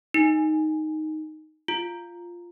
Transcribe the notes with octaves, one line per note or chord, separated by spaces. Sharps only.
D#4
F4